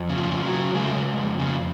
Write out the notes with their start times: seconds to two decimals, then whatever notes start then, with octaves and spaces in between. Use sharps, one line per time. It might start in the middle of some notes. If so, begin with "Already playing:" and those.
Already playing: F2
0.09 C#3
0.16 F3
0.30 C#3
0.45 F#3
0.52 C#3
0.74 C#3 G#3
0.83 A3
0.92 C#3 G#3
1.17 F2
1.39 C#3